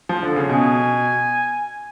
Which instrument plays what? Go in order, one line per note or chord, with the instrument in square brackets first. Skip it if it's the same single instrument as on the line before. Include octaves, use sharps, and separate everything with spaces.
[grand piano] F3
D3
C#3
[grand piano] B2 [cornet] G#5